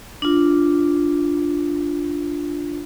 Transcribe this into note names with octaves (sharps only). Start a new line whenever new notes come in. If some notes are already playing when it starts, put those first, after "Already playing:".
D4 F4